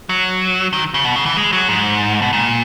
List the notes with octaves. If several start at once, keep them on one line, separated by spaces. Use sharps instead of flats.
F#3
D#3
C#3
B2
C#3
E3
G#3
F#3
G#2
B2
A#2